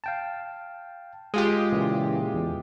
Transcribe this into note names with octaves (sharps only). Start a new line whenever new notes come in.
F5 G5 A5
G#3 F4 G4 D#6
A#2 C#3 E3
E2